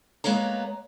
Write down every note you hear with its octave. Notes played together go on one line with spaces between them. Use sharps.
G#3 A#3 B3 C#5 A#5